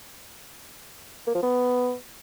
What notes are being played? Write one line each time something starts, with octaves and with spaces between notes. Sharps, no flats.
A#3
F3
B3